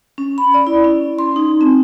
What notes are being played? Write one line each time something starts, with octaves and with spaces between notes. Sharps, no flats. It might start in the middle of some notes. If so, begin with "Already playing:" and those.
C#4
B5
D5
E4
C#4
C6
D#4
C4